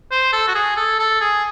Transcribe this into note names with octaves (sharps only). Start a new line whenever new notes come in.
C5
A4
F#4
G#4
A4
A4
G#4